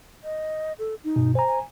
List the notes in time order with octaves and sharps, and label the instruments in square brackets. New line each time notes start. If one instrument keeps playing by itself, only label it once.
[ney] D#5
A4
D#4
[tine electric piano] G2 B2
[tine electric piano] C5 A#5 [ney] G#5
[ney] G#5